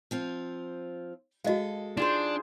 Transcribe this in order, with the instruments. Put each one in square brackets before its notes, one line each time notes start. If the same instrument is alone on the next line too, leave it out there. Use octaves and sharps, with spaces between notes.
[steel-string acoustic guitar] F3 C4 F4
[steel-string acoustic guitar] G#3 A4 [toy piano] F#4 D#5 F5
[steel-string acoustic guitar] D#3 [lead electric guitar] D4 [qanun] F4 G#4 C5